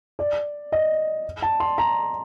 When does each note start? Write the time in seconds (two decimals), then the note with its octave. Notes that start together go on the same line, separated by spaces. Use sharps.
0.19 D5
0.72 D#5
1.42 A5
1.60 C6
1.78 A#5